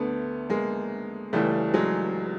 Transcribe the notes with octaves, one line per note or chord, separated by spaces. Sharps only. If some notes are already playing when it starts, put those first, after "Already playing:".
Already playing: D2 D3 A3 B3
G#3 A#3
C#2 C#3 E3 G3 A3
F#3 G#3